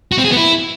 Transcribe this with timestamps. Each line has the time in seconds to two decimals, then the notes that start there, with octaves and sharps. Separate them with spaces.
0.12 F#4
0.18 C4
0.24 G#4
0.30 B3
0.37 E4